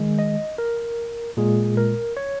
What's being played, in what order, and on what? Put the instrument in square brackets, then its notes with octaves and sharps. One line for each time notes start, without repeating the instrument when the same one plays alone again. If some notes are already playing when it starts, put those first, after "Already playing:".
Already playing: [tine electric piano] D#3 G#3
D#5
A#4
A#2 G#3 G#4
A#4
C#5